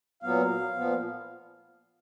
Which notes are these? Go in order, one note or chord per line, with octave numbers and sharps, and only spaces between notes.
A#2 F#3 B3 F5
A#2 F3 B3